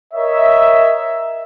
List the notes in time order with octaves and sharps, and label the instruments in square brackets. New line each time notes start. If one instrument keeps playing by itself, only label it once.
[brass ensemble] A#4 C#5 D#5 E5